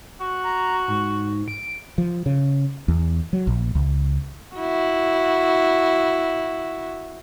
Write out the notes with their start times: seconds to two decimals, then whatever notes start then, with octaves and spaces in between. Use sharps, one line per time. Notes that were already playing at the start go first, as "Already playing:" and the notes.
0.20 F#4
0.44 A#5
0.88 G#2
1.48 D7
1.98 F3
2.26 C#3
2.88 E2
3.33 F#3
3.47 A#1
3.75 C#2
4.56 E4 F#4